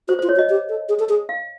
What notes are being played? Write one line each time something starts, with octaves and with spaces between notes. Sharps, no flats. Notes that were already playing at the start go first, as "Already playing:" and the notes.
F#4 C5
C5
F4
C#5
F#4
D#5
G4
A4
G#4
A4
G#4
F5